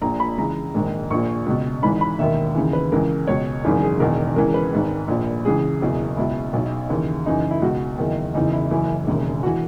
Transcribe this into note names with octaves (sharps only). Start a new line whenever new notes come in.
A#1 A#2 A#5
B5
C#2 C#3 E3 A#5
A#1 G#2 D#3
A#1 A#2 C#6
C#2 B2
G#1 G#2 E3 B5
B5
E1 D#2 D#3 E5
D#2 C#3 E3
B4
C#2 C#3 E3 A#4
C#2 B2 C#5
G#1 F#2 C#3 E3 G#4
G#4
E1 E2 D#3 A#4
C#2 C#3 E3 A#4
B4
G#1 G#2 D#3
A#1 A#2
C#2 C#3 E3 G#4
F#1 E2 B2
C#2 B2 E4
B1 B2
D#2 C#3 E3
F#1 F#2 C#3 E3 D#4
E4
C#2 B2 F#4
F#1 E2 D#3
F#1 E2 C#3 E3 D#4
E4
F#1 F#2 E3 E4
E1 D#2 C#3
E3 F#4